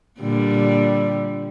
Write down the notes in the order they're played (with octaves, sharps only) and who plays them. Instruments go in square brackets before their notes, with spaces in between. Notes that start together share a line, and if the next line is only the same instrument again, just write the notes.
[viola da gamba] A#2 D3 G3